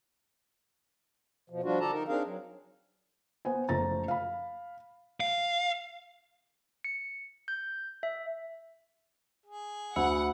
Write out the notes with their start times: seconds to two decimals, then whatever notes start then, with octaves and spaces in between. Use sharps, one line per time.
1.50 B2 F3
1.63 F3 G3 D4 F4 F#4
1.80 D3 G4 A4 A5 A#5
1.92 D#4 A#4
2.08 C4 D4 D#4 G#4 A#4 F5
2.25 F#3
3.45 B3 C5 G#5
3.69 F#1 F3 A3 C5 A#5 A6
4.08 F5 B5
5.20 F5
6.84 C#7
7.48 G6
8.03 E5
9.46 G#4
9.96 D2 F#5 B5 E6 C#7